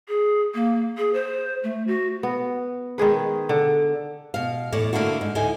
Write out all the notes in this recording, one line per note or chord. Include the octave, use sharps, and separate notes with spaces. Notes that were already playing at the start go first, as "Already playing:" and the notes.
G#4
A#3
G#4
C5
A3
F#4
B3
D#3 G#3 G#4 B4
D3
B2 F5
E2 A2 C#5 D5
D3 A#3 D4 E4 F#4
G#2
D2 A2 D#4 G#5